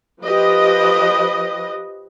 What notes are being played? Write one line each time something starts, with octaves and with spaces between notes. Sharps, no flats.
F3 G4 B4 D#5